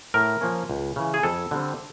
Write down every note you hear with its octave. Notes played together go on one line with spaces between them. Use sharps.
A2 A#4
F3 A#3 C#4
C#2
C#3 E3
G#4
F2 A4
D3 G3 C4